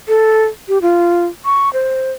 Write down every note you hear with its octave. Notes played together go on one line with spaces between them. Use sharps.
A4
G4
F4
C#6
C5